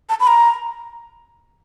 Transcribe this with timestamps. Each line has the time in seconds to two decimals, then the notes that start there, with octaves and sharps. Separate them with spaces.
0.09 A5
0.20 B5
0.27 A#5